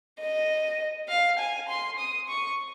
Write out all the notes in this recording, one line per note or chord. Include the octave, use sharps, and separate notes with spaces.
D#5
F5
G#5
C6
D#6
C#6